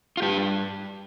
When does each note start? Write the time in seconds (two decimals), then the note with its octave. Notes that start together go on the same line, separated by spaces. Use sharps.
0.17 F4
0.22 G2 G4